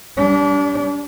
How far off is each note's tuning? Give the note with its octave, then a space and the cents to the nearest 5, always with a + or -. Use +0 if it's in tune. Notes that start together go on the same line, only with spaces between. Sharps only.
G3 +0 D4 -35